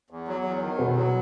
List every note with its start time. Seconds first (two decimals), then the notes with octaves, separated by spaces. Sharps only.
0.10 E2
0.28 F#3
0.44 E2
0.62 D#3
0.78 E2 B2 B3
0.95 F#3